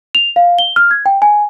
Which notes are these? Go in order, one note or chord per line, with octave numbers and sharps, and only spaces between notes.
F7
F5
G7
F6
G#6
G5
G#5